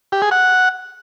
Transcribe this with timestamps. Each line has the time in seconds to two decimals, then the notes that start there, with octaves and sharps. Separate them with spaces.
0.12 G4
0.22 G#4
0.31 F#5